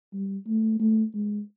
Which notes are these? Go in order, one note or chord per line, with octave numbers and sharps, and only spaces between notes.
G3
A3
A3
G#3